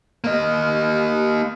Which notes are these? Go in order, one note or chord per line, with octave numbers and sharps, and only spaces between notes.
A#3 D#5